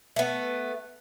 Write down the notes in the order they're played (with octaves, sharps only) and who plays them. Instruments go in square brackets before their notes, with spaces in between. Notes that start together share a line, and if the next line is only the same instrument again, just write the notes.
[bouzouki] A3 B3